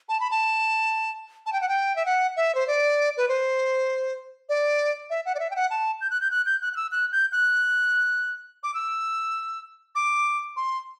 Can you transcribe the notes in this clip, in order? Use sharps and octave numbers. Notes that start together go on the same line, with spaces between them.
A5
B5
A5
A5
G5
F#5
G5
E5
F#5
E5
C5
D5
B4
C5
D5
E5
F#5
D5
E5
G5
F#5
A5
G6
F#6
G6
F#6
G6
F#6
F#6
E6
F#6
G6
F#6
D6
E6
D6
C6